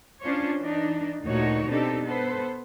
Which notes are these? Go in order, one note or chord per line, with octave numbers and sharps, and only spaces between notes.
C#4 D4 F4 C5 C#5
E3 D4 D#4
D2 A#2 A3 D#4 F#4 C#5
B2 C4 D4 D#4 G4 A4
B3 A4 B4 C5